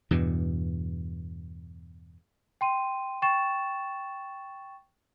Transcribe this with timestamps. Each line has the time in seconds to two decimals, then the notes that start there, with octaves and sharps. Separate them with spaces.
0.11 E2 G2 B2
2.61 G5 C6 D#7
3.22 G5 C#6 A6 E7